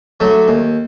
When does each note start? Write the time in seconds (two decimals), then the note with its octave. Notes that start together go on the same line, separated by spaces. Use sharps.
0.20 D3 F#3 A3
0.48 D#2